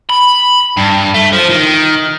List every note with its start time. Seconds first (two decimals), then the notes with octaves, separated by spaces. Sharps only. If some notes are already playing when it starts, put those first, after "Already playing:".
0.10 B5
0.77 G2
1.14 A3
1.32 F3
1.50 D#3